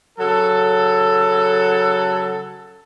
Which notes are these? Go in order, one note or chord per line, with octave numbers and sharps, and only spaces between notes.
C#3 F#3 A4